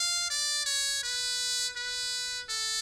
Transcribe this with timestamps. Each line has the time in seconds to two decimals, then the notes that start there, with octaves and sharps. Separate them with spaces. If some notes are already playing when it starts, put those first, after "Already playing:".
Already playing: F5
0.30 D5
0.66 C#5
1.03 B4
1.76 B4
2.49 A4